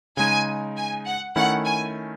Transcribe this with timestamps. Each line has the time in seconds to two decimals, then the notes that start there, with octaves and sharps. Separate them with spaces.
0.17 C#3 G#3 D#4 G#5
0.77 G#5
1.06 F#5
1.36 D#3 A3 C#4 E4 F#5
1.65 G#5